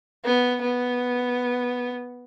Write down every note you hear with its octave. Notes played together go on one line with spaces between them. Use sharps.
B3
B3